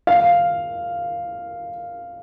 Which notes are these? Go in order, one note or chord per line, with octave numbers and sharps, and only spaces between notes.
F5